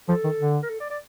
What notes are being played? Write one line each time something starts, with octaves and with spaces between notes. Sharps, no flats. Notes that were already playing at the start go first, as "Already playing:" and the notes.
F3 A4
D#3
D3
A#4
A4
D5
D5